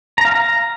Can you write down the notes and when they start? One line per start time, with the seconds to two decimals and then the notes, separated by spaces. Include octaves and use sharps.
0.18 A#5
0.25 F5
0.32 A#5